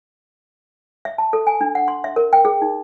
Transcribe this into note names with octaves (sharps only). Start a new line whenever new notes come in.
E5
A5
A4
G#5
D4
F#5
C6
E5
A#4
G5
G#4
D#4